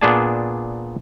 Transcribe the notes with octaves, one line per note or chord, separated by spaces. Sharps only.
A#2 B3 D4 G#4 D5 A5